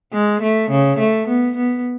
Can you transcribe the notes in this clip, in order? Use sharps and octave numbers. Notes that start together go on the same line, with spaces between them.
G#3
A3
C#3
A3
B3
B3